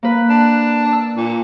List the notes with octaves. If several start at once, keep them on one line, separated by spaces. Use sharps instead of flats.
A#3 B4
D4
E6
A#2